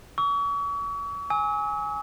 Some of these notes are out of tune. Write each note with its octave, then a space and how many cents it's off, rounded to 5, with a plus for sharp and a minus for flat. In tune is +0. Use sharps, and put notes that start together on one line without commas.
C#6 +40 E6 -15
G#5 +0 E6 -45